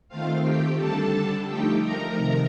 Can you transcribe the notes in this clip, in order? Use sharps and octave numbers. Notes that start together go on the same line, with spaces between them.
D#3 A3 C4 F4 F5
G4 G5
D3 G3 D4 A4 A5
F3 A3 D#4 G4 G5
A#4 A#5
C3 D#3